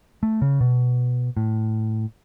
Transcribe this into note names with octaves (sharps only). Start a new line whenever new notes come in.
A3
C#3
B2
A2